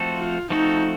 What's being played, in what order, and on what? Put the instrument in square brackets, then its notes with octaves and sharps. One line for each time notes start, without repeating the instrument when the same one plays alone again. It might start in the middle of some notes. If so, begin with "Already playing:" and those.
Already playing: [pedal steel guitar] F3 A3 C4 F#4 A4
[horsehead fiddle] F4
[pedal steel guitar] F3 A3 C4 F#4 A4 [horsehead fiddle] D#4